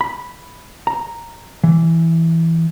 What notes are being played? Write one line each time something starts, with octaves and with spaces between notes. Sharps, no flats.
B5
A#5
E3